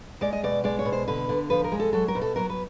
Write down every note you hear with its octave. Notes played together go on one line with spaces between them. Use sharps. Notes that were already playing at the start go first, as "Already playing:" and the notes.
G#3 D5
D#5
B2 D5
G#3 D5
C#5
B2
C5
D3 B4
D3
F3 B4
A#4
G#3
A4
F#3 A4
A#4
B2
A4
F#3 A#4
B4